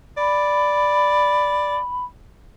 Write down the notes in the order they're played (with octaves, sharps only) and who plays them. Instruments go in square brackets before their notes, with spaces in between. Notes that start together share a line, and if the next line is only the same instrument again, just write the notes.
[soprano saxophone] D5 [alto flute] B5